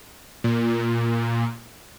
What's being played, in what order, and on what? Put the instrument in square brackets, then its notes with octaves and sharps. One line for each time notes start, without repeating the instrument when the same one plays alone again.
[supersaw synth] A#2